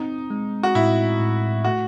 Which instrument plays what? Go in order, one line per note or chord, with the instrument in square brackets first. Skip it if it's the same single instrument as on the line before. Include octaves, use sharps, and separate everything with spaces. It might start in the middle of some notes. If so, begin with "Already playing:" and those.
Already playing: [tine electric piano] C4 [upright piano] D#4
[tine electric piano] G#3
[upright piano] F#4
[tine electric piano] A2 [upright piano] E4
[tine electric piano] A2
[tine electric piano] A3 [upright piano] F#4